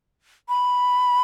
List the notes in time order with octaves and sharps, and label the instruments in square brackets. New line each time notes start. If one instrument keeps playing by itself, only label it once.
[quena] B5